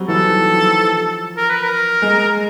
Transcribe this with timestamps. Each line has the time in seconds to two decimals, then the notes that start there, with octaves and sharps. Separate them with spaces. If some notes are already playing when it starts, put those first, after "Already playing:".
Already playing: F#3 G3 C4
0.08 E3 A4
0.30 D#3
0.51 F3
1.37 A#4
1.50 B4
1.63 A#4
2.02 G#3